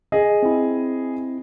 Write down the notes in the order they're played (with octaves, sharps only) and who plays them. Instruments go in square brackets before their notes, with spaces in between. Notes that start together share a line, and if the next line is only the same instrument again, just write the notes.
[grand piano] G#4 D#5
[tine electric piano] C4 E4